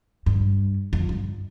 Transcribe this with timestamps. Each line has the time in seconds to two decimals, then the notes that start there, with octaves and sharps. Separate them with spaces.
0.26 G2
0.93 F2
1.09 G2